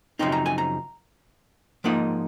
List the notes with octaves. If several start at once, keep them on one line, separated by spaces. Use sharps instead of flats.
F#2 C#3 F3 C4 D#4 C6
A#5
G#5
A#5
G#2 F3 A#3 D#4 F#5